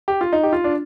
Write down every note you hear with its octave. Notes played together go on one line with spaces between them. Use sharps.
G4
F4
D#4
G4
F4
D4